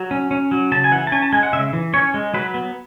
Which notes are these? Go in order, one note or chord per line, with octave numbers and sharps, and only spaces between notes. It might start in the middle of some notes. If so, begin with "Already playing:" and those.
Already playing: F#3
C#4
C#4
F#3
C#3 A5
G#5
E3 F#5
A5
C#4 G#5
A5
G#3 G#5
F#5
C#3 E5
E3
C#4 C#5
G#3
F#3 B4
B3